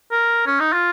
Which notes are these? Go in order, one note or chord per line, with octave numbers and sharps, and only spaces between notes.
A#4
C#4
D#4
F4